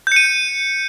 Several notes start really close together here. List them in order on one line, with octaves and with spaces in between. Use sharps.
G6 C#7 D#7